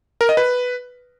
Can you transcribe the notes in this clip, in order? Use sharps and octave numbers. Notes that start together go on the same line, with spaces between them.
A#4
D#5
B4